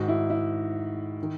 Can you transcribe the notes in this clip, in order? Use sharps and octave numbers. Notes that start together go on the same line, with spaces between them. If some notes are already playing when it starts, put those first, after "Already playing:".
Already playing: G#2 D#3 F#4
E4
E4
D#3